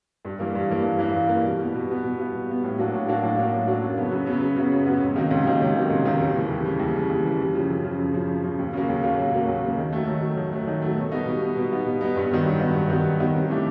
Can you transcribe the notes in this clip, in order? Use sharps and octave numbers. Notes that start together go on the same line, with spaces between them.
G2
E3 G3 A#3
G2
E3 G3 A#3
G2
E3 G3 A#3
G2
E3 G3 A#3
B2
G3 B3
B2
G3 B3
B2
G3 B3
B2
G3 B3
A2
F#3 A#3 D4 F#4
A2
F#3 A#3 D4 F#4
A2
F#3 A#3 D4 F#4
A2
F#3 A#3 D4 F#4
F#2
C#3 F#3 B3
F#2
C#3 F#3 B3
F#2
C#3 F#3 B3
F#2
C#3 F#3 B3
C#2
C3 D#3 F#3 A#3
C#2
C3 D#3 F#3 A#3
C#2
C3 D#3 F#3 A#3
C#2
C3 D#3 F#3 A#3
D#2
C#3 E3 G3
D#2
C#3 E3 G3
D#2
C#3 E3 G3
D#2
C#3 E3 G3
F#2
C#3 F3
F#2
C#3 F3
F#2
C#3 F3
F#2
C#3 F3
D#2
C#3 F#3 A#3
D#2
C#3 F#3 A#3
D#2
C#3 F#3 A#3
D#2
C#3 F#3 A#3
D#3
F#3 A3
D#3
F#3 A3
D#3
F#3 A3
D#3
F#3 A3
B2
G3 B3 D#4
B2
G3 B3 D#4
B2
G3 B3 D#4
B2
G3 B3 D#4
G2
D#3 F#3 B3
G2
D#3 F#3 B3
G2
D#3 F#3 B3
G2
D#3 F#3 B3
C3
E3 A3 D4 G4